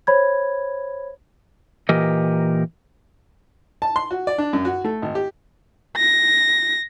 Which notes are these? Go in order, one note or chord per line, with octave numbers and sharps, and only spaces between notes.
C5 C#5 B5 G#6
A#2 E3 G4 A#4 D#5
A5
C6
F#4
D5
D4
F#2
F#4
A3
G#1
G4
A#6